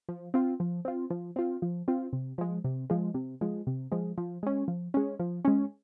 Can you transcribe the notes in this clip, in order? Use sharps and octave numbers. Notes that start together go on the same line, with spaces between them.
F3
C4 F4
F3
C4 F4
F3
C4 F4
F3
C4 F4
C3
F3 G#3
C3
F3 G#3
C3
F3 G#3
C3
F3 G#3
F3
G#3 C#4
F3
G#3 C#4
F3
G#3 C#4